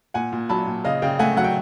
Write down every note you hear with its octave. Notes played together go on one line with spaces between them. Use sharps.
A#2 F#5 G#5
A#2
F#3 A5 B5
A#2
C#3 D#5 F5
C#3 F5 G5
A3 F#5 G#5
F#3 F#5
G5